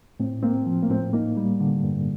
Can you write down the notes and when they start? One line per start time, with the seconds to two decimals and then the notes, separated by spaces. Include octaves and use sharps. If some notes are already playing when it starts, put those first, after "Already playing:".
0.20 A2 C4
0.43 A#3 C4
0.66 F3
0.82 A#3
0.89 A2 C4
1.13 A#3 D#4
1.37 G3
1.60 D3
1.83 G2